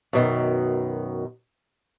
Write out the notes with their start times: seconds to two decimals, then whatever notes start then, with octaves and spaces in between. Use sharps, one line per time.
0.13 F#2 B2 D#3